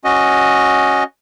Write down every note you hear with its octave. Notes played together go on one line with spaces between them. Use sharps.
C#4 F#4 D#5